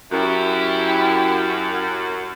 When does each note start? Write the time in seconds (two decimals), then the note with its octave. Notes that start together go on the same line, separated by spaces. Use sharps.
0.12 F#2 E4 G4